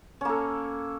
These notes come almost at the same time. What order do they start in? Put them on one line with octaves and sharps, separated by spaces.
C#4 A#3 A4